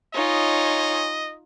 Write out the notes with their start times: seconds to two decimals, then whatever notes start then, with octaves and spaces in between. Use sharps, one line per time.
0.14 D#4 F4 C#5 D#5 G#5